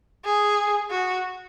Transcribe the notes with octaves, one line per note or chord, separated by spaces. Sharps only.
G#4
F#4